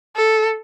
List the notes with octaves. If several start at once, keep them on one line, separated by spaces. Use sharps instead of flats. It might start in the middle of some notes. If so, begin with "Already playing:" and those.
A4